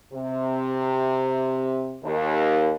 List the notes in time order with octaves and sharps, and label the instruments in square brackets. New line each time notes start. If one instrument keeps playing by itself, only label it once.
[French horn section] C3
D#2